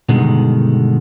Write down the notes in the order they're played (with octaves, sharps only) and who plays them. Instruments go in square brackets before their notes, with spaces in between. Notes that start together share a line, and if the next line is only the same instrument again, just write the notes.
[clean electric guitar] G2 B2 D3 D#3 G#3